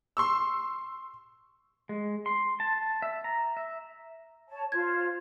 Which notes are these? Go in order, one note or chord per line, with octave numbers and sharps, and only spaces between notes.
C6 C#6 E6
G#3
C6
A5
E5
A#5
E5
C#5 A5
F4 C5 G#6